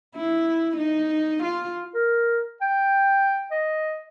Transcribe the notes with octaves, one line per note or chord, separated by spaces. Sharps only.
E4
D#4
F4
A#4
G5
D#5